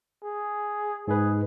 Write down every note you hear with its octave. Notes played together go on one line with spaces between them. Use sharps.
G#4
G#2 G#4 B4